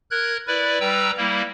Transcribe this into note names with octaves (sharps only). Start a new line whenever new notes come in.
A#4 F#6 G#6
E4 B4 D5
G3 B4 G5 A#5 E6
G3 A#3 E4